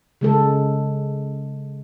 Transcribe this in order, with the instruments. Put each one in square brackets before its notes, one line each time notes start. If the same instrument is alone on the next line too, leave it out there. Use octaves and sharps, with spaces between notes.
[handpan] C#3 G#3 A4